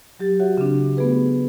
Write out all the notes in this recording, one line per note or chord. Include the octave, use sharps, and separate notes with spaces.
F#3 G4 A6
F#4 C#5 E5 F#5
C#3 C4 D4
A3 B3 F#4 G#4 B4